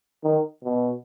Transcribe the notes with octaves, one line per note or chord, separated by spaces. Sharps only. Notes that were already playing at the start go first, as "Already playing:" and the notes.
D#3
B2